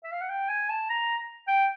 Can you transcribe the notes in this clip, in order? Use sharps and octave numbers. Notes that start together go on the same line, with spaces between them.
E5
F5
F#5
G5
G#5
A5
A#5
G5